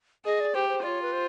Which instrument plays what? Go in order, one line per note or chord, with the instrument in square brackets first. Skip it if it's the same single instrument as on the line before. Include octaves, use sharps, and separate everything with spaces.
[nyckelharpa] G#4 [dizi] D#5
[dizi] D5
[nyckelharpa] G4 [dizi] C5
[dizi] C5
[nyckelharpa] F4 [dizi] D5
[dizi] C#5
B4
C5